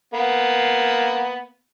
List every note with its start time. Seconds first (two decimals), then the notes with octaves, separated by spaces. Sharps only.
0.14 A#3 B3